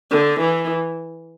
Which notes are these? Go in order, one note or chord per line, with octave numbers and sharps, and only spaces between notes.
D3
E3